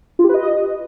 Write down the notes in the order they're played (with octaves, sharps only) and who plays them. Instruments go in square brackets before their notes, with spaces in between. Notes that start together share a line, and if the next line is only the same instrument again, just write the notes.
[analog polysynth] F4
G4
B4
D#5